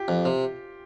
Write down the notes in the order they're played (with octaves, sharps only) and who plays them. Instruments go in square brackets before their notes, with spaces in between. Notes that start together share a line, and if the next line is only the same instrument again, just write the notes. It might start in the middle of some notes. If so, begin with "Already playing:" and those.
Already playing: [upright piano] F4 G4
[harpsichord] F2
C3